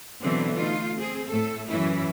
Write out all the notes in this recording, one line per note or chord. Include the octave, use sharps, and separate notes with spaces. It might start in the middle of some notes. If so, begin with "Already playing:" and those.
B2 D3 E3 F#3 B3 C4
A3 D#4 F4
C4 G#4
A2 A3 A4
F#2 E3 C#4 E4